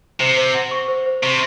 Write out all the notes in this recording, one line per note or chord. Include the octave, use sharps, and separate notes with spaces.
C3 C5
C5
F#5
C#6
C5
C5
C3 C#6